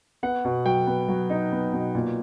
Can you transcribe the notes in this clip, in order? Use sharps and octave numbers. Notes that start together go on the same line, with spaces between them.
B3 F#5
B2
F#3 G5
B3
F#3
D#4
B3
B2
A#2